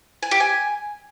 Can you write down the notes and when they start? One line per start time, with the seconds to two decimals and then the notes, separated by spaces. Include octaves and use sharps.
0.23 G#5
0.31 G4
0.40 G#5